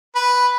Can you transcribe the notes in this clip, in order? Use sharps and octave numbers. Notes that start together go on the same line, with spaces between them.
B4